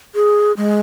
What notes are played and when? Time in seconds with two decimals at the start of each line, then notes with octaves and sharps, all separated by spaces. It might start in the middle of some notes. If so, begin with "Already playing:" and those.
0.15 G#4
0.57 G#3